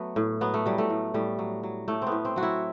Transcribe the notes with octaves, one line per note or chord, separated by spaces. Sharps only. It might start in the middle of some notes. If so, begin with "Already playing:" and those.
Already playing: F#3 A3 B3
A2
F#3 B3
A3
F#3 G3
A3
A2
A2 G3
F#3
F#3
A2 A3
B3 C4
A2
C4
F#3 F#4
E4